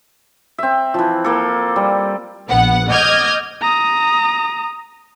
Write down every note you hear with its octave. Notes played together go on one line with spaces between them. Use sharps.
C4 E5
E3 F3
A#3 A4
G3
A#1 B3 F#5
D#5 D6 D#6 F6 G6 G#6
A#5 D#6